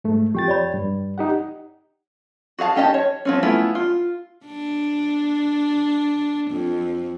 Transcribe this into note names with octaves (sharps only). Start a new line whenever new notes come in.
G#2 A3
F2 G4 G5 A6
C#5 D5 B5
G2
D#4 G4 F#5
F#4 G#4 F5 A5
D#3 C#4 G4 D#5 A5
C#5
F3 C4 C#4
A3 B3 C#4 E4 F4
F4
D4
F2